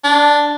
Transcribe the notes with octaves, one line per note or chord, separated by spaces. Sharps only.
D4